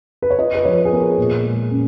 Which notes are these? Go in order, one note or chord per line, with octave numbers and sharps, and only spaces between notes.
B4
C#5
F4 D#5
B4
F3 C#5
G#4
B3 A#4
A#2
G#3
C#4